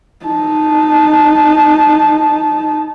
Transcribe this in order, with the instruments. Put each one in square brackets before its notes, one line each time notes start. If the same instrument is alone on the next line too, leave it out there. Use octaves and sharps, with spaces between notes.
[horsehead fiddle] D#4 A5